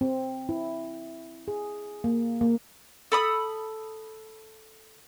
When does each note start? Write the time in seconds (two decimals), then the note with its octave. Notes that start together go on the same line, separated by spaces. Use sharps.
0.01 C4
0.49 E4
1.48 G#4
2.04 A#3
2.41 A#3
3.12 A4 B5 D#6